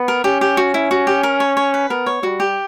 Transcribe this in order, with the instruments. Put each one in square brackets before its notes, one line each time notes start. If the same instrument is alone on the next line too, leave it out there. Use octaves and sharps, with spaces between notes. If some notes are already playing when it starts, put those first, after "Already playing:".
Already playing: [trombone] B3
[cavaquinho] A#4
[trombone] C#4 [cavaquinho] G4
[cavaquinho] G4
F#4
E4
F#4
G4
A#4
C#5
C#5
B4
[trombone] B3 [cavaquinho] A#4
[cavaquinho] C#5
[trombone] G3 [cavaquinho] F#4
[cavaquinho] G4